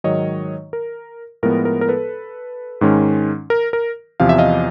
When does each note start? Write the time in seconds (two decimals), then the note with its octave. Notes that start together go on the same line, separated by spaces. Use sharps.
0.04 G#2 D#3 F#3 C#5 D#5
0.73 A#4
1.43 A2 F3 G#3 B3 A#4
1.65 A#4
1.81 A#4
1.89 A4 B4
2.81 G#2 D#3 G#3 C#4
3.50 A#4
3.73 A#4
4.20 E2 C3 F3 F5
4.29 E5
4.38 D#5 F5